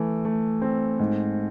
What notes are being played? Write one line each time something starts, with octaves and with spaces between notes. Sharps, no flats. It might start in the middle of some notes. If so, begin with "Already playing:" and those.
Already playing: E3 A3
A3
C4
G#2